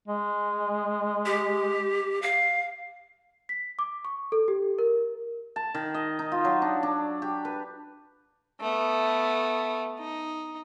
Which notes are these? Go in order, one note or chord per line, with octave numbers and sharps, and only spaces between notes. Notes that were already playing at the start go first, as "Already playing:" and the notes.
G#3
G4
F5
B6
D6
C#6
A4
G4
A#4
A5
D#3
D#5
D#4
F4
F#3
D4
D4
G4
B4
A3 B3
D#4